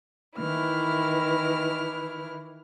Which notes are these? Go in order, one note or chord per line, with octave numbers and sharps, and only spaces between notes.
D#3 E3 E4 F6